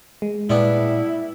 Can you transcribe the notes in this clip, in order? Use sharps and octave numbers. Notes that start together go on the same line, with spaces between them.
G#3
A#2 G3 B3 D4 E4